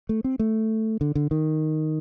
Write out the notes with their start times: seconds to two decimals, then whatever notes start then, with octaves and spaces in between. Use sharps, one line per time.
0.09 A3
0.24 C4
0.39 A3
1.01 D3
1.15 D3
1.31 D#3